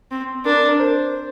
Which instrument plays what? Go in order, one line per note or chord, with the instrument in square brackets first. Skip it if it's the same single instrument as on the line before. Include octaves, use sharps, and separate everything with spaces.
[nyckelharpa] C4
[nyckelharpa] D4 [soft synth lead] A#4
[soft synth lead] A#4
C5